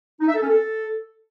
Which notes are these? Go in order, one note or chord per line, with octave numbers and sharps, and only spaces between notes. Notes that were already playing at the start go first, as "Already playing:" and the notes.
D#4
E5
A4
C#4
A4